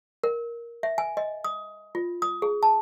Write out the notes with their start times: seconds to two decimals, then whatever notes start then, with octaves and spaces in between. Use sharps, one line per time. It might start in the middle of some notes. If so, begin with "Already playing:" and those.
0.24 A#4
0.83 E5
0.98 G#5
1.17 D#5
1.44 D#6
1.95 F4
2.22 D#6
2.42 G#4
2.63 A5